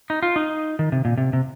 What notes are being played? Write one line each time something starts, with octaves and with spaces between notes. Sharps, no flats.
D#4
F4
D#4
D#3
C3
A#2
C3
C3